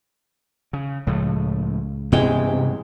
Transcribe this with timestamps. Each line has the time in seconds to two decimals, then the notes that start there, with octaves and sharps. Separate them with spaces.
0.73 C#3
1.07 C#2 A2 F3 A3
2.12 G2 C3 E3 G#3 B3 C#4 G5